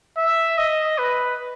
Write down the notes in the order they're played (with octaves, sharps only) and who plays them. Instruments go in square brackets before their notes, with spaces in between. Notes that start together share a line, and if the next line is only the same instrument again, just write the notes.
[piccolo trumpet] E5
D#5
B4